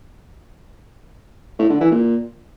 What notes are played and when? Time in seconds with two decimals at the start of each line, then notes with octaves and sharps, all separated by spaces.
1.59 A2
1.70 D3
1.80 E3
1.91 A#2